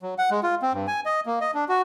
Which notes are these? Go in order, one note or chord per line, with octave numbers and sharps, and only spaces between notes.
F#3
F#5
G#3
F4
C4
G2
G#5
D#5
A#3
D#5
D4
F#4